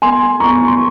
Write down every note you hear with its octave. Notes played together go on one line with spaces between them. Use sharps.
G#5 C6
A#5 C#6
C6